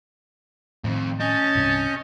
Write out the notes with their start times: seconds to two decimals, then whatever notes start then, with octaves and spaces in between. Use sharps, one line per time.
0.84 F2 A2 D#3
1.20 C#4 D#5 A5 G6
1.55 C2 G2 C3